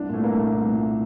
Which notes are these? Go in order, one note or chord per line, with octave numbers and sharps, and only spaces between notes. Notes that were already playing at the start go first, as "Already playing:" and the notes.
Already playing: C2 D4
A#2 A3
C2 A#3
A#2
C2
A#2